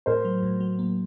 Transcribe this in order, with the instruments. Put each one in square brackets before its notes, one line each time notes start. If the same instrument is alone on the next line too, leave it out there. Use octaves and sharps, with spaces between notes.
[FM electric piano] A2 [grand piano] A#4 C5
[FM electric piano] F#3
A2
F#3
A#3